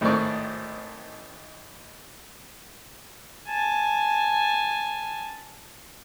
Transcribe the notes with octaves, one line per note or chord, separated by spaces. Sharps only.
G#1 A2 D#3 C5 D5 C#6
G#5 A5